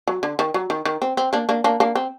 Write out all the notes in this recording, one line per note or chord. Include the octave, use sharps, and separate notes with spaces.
F#3
D3
D#3
F#3
D#3
D#3
C4
C4
A#3 D4
A#3 D4
A#3 D4
A#3 D4
C4